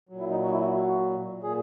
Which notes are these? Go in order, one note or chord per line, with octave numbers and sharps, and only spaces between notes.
A#2 F#3
E4
D#4
F#4
E4
F#4
F#4
A#2 G#4